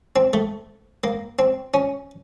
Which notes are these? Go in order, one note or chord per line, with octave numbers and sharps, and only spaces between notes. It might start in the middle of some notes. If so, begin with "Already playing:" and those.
C4
A3
A#3
C4
C#4